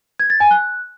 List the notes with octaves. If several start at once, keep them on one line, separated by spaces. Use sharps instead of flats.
G#6
A6
G#5
F#6